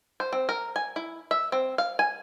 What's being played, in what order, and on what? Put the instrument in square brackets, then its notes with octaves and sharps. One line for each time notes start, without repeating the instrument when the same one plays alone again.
[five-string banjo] C5
C4
A#4
G#5
E4
E5
C4
F5
G#5